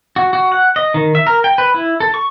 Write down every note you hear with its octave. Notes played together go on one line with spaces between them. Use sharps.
F#4
F#4
F#5
D#5
D#3
E5
A#4
G5
B4
E4
A4
C#6